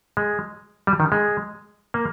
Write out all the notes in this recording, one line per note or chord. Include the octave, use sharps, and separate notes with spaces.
G#3
G3
D#3
G#3
A#3